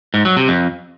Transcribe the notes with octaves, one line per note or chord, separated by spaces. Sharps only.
G#2
F#3
C3
F2